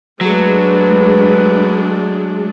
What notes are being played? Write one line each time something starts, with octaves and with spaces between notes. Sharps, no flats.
F#3 G#3 A3 D4 B4